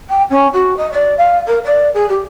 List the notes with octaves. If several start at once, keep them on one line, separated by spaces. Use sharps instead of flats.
G5
C#4
F#4
D#5
D5
F5
A#4
D5
G#4
G4